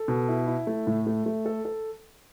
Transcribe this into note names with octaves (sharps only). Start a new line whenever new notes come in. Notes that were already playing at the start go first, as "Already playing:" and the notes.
Already playing: A4
B2
E4
E4
A3
A2
A3
A3
A4
A4